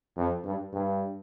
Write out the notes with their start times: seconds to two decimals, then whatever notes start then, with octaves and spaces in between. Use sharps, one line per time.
0.17 F2
0.44 G2
0.73 G2